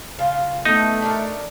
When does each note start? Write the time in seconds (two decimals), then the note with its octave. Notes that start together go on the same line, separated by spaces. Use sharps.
0.19 C#3 F4
0.65 A3 B3 D#4
1.02 D4 A4 A#4